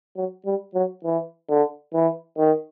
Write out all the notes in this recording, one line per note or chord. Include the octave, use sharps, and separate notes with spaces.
F#3
G3
F#3
E3
D3
E3
D#3